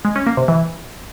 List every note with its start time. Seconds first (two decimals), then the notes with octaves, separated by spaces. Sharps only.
0.05 G#3
0.16 C#4
0.26 A#3
0.37 C3
0.48 E3